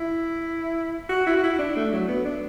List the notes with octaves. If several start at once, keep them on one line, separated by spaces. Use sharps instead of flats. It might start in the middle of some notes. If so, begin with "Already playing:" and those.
Already playing: E4
F#4
E4
F#4
E4
D4
A3
F#3
B3
D4